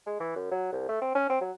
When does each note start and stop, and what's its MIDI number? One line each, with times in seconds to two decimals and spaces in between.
0.07 0.15 56
0.20 0.32 52
0.36 0.47 42
0.52 0.70 54
0.72 0.86 36
0.89 0.99 57
1.02 1.13 60
1.15 1.26 61
1.30 1.38 60
1.41 1.52 54